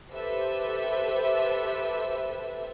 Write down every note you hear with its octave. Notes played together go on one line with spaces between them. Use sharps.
G4 A4 B4 C5 E5